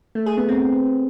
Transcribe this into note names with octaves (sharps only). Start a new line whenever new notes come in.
A3
G#4
B3
C4